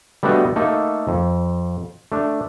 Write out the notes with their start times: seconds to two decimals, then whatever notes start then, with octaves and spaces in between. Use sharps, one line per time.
0.23 G3 A3 B3 D4 F#4 D#5
0.56 A3 A#3 D#4 A4
1.08 F2
2.12 A3 D4